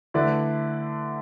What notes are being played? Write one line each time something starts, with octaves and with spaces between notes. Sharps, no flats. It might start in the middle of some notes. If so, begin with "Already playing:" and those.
D3 A3 E4 B4 D5